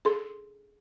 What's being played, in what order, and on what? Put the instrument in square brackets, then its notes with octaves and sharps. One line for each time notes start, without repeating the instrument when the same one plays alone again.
[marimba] G#4 A4 C6